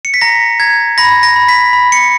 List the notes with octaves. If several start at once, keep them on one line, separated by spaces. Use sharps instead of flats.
C#7
B6
A#5 A#6
A#5 G#6
B5 A#6
A#6
B5
B6
B5
C#7